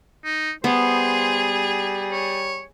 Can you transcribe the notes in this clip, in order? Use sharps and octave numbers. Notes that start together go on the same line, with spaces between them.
D#4
G3 B3 G#4 C5
C#5